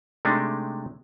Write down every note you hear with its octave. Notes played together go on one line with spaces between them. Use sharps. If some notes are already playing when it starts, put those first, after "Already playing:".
C3 G#3 A3 D4 D#4